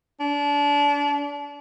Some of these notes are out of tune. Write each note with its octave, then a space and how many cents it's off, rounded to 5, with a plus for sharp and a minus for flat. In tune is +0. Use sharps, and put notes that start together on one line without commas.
D4 -30